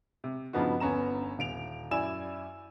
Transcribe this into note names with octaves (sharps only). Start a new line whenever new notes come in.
C3
G2 C#3 F3 B3 D#4 F#4
G1 B3 C#4 A#5 E7
D#1 D7 F7
F#2 E4 D5 G#5 E6 E7